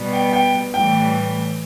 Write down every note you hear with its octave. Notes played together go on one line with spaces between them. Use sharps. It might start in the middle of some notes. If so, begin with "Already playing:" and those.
Already playing: B2 G3 B3
G5
G5
A2 E3 G3 G5